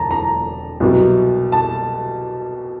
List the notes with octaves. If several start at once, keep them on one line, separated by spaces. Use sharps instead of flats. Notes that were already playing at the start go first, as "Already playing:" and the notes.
Already playing: E1 D3 A5 A#5
A#5
C2 B2 F#3
A5